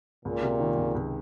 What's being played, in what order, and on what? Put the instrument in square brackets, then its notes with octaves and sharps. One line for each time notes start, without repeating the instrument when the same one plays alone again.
[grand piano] C#2 [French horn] A#2
[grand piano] C3
D#3
C#2
C#2